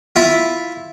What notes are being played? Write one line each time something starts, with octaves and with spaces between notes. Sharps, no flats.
E4 F4